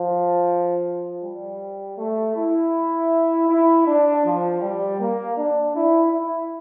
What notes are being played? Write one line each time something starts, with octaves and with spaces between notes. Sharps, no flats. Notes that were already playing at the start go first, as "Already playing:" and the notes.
Already playing: F3
G3
A3
E4
E4
D4
F3
G3
A#3
D4
E4
E4